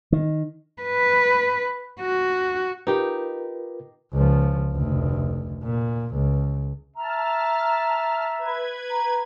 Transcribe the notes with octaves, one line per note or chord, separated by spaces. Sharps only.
D#3
B4
F#4
D#4 F4 G4 A#4 B4
C#2 F3
F1 D2
A#2
C#2
E5 A5 A#5 F6
B4 G#6
A#5